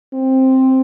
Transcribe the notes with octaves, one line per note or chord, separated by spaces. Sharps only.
C4